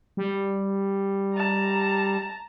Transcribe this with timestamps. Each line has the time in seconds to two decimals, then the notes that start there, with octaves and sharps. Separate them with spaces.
0.17 G3
1.34 A5 A#5